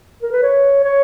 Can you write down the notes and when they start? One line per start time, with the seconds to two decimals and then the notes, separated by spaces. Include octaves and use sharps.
0.23 A#4
0.32 B4
0.43 C#5
0.84 C#5